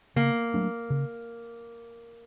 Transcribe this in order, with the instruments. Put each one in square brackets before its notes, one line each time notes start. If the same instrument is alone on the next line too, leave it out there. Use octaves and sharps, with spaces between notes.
[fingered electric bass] C#3 [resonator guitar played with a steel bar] A#3
[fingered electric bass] F#3 A3 D4
C#3